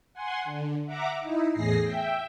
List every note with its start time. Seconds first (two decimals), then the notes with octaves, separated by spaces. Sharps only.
0.14 F#5 G#5 C6
0.45 D3
0.86 E5 F#5 A#5 D6
1.20 D#4 E4
1.52 E2 A2 G#4 A#6 C7
1.83 E5 G5